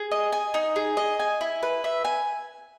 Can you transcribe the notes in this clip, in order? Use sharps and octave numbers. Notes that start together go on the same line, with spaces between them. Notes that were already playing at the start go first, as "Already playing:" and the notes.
Already playing: G#4
D#5
G#5
D#4
G#4
D#5
G#5
E4
B4
E5
G#5